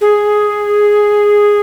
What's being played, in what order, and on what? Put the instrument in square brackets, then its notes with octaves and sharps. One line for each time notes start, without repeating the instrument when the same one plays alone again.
[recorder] G#4